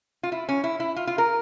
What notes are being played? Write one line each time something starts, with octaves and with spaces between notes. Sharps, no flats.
F4
E4
C#4
E4
E4
F4
F4
A#4